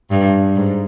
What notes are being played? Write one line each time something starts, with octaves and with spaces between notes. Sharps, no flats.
G2
G#2